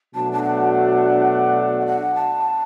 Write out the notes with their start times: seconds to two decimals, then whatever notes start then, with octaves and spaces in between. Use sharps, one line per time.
0.14 B2 F#3 A3 D4 F#4 A5
0.32 A5
0.43 F#5
1.81 E5
1.86 F#5
2.15 A5